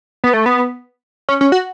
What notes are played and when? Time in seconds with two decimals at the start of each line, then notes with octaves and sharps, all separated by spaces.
0.24 B3
0.34 A3
0.46 B3
1.29 C#4
1.41 C#4
1.52 F#4